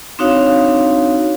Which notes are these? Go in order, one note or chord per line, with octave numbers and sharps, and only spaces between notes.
C4 D4 D#4 F#4 C#5 F5